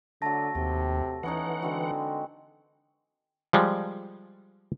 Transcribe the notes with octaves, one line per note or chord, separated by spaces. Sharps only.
D3 F#3 A3 A5 A#6
D#2 C3 G5
E3 B3 C#4 D#4 F#5
D3 G#3 C4 F#4
F3 G3 G#3